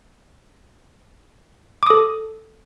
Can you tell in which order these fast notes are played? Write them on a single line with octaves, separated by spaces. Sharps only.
D6 D#6 A4